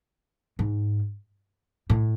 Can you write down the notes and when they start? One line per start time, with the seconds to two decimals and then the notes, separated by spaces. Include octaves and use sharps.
0.59 G#2
1.90 A2